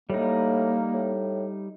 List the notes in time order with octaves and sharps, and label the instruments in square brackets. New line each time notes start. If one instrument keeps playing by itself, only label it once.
[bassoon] A2 [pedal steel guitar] G3 D#4 [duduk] A#3
[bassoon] A2